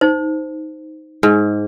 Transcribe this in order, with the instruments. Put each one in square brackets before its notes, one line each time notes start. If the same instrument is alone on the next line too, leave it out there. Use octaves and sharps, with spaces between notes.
[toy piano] D#4 C5
[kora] G#2